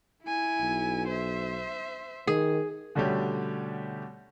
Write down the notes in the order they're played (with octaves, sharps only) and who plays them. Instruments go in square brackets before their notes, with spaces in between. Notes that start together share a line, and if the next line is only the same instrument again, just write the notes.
[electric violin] E4 G#5
[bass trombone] B1
[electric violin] C5 E5
[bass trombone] D#3 [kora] G#4
[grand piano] B2 D3 G3 A3 C#4 G4